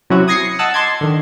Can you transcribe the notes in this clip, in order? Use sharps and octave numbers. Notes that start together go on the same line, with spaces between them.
C3 F#3 C#4 E4 F#4
D#6 G#6 A#6 C7 C#7
D#5 F#5 A5 E6 F#6
A5 C6 D6 G#6
D3 D#3